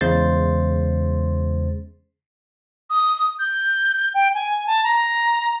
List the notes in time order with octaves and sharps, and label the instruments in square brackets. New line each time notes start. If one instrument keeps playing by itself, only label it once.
[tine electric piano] E2 C#3 G#3 C5 C6 A6
[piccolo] D#6
G6
G5
G#5
A5
A#5